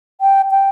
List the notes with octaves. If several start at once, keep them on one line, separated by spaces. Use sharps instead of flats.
G5
G5